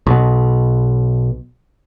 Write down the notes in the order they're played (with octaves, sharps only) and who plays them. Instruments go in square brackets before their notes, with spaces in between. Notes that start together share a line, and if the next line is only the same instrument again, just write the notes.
[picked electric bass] B1 B2